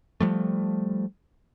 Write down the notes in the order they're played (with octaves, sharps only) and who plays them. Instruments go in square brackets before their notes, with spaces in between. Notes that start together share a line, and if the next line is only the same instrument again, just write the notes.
[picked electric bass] F3 G3 A3